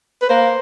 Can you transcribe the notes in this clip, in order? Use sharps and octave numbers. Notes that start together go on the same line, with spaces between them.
B4
A#3 C5